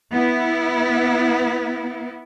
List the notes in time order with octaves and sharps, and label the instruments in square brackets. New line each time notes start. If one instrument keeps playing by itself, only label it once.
[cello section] B3 E4